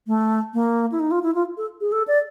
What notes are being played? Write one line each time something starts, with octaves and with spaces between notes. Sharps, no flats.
A3
A#3
E4
D#4
F4
E4
F4
A4
G#4
A4
D5